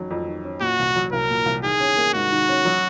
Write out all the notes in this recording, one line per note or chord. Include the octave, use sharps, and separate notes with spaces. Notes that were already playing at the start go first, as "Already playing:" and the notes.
Already playing: F2 D#3 F#3 C#4
F2
D#3
C#4
A#2 F#4
C2
F#3
C2 A#4
A#2
C2
D#3 G#4
C#4
A#3
G#2 F#4
D#3
C#4
F#3